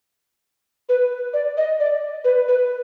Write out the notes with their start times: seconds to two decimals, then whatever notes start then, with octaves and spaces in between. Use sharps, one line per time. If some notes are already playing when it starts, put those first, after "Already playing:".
0.89 B4
1.34 D5
1.57 D#5
1.80 D5
2.24 B4
2.48 B4